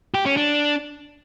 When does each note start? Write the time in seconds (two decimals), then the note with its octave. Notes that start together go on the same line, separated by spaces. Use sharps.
0.14 G4
0.26 C#4
0.37 D4